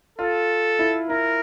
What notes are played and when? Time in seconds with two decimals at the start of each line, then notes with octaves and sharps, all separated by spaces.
0.18 F4 A4
0.79 E4
1.09 E4 A#4